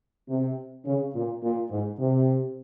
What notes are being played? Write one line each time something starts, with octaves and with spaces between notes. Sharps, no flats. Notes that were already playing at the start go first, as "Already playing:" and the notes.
C3
C#3
A#2
A#2
G#2
C3